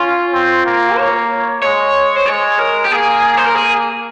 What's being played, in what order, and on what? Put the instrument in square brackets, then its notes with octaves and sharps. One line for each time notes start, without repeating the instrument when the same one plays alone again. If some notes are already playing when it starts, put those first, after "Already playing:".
Already playing: [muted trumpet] C#4 [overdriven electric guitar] F4
[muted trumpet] C4
A#3
[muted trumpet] A#3 [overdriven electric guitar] C#5
[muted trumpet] G#3 [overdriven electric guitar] C#5
[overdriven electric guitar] C5
[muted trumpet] G#3 [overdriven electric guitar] C#5
[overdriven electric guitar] A#4
G4
[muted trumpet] A#3 [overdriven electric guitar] G#4
[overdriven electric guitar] C5
A#4
G#4